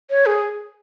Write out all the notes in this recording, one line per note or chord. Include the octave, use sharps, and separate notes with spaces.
C#5
G#4